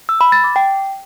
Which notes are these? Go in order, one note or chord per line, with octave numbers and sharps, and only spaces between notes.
E6
B5
A6
D6
G5